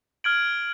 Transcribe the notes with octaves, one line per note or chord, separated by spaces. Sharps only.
F6 G#6 D7 F#7